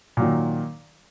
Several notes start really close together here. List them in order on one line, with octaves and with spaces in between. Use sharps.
A#2 F#3 D#3